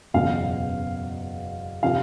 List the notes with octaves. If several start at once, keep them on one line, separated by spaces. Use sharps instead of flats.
F#1 E2 B2 F5
C3 F3 F5